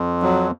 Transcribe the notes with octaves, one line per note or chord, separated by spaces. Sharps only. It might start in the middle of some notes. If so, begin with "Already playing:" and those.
Already playing: F2
F#3